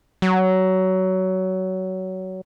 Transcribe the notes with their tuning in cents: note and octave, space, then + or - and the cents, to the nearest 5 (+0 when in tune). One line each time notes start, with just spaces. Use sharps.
F#3 +20